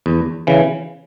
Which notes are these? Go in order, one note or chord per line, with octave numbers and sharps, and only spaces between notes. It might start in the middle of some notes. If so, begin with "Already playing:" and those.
E2
C#3 E3